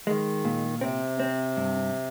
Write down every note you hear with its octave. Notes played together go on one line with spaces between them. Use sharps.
D#3 G#3
A#2
C3 C4
C4
G2